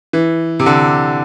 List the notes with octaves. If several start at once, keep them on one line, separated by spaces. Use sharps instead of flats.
E3
C3
D3